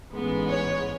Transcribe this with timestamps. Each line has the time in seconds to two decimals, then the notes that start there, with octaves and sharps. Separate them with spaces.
0.12 A1 G#2 G#3 B3
0.50 C#5